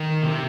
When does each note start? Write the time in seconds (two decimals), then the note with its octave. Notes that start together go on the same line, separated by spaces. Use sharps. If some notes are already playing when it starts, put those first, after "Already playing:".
Already playing: D#3
0.22 C3